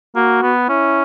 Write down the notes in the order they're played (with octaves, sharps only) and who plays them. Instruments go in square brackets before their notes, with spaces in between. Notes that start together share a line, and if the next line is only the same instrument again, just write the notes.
[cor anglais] A#3 [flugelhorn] F#4
[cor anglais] B3
[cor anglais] C#4 [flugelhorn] E4